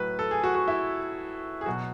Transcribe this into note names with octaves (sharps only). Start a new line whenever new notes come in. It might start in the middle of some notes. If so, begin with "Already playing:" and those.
Already playing: A2 F#3 B4
A4
G#4
F#4
F#4
E4
G#4
B2 F#3 F#4